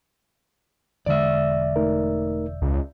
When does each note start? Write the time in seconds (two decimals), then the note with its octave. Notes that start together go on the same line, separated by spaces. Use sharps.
1.06 E1 D3 G#3 D5 E5
1.76 A3 D#4 A#4
2.62 C#2